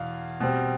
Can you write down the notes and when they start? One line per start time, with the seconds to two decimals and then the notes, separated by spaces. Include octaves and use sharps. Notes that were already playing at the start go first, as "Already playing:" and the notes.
Already playing: E2 B2 F5
0.40 B2 G3 C4